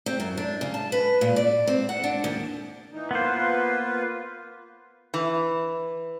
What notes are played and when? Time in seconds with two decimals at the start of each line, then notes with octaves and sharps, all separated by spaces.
0.06 C4
0.20 F#2
0.37 D4
0.61 C#3
0.74 A5
0.92 B4
1.21 A#2
1.36 D5
1.67 C4
1.89 F#5
2.04 D4
2.24 D#2
2.93 E3 D#4
3.11 A#3 B3 F4 B4 C5
5.14 E3